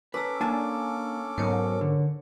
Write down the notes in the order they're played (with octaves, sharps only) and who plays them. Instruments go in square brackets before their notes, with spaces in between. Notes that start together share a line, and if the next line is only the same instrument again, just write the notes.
[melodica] C#4 A4 D6 [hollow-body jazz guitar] B4 [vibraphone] A#5 E6
[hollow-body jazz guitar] A#3 G#5 A5 [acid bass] D4
[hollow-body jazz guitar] B1 B2 [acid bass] G#2 [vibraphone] A#4 C#5
[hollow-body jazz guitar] D3